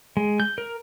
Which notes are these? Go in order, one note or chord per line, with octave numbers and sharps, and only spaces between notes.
G#3
G6
A#4